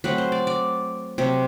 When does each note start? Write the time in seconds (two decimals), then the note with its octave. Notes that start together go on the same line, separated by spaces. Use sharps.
0.04 F#3 A3 C4 B4
0.18 C5
0.32 D5
0.47 D5
1.18 C3 F#3 C4 G4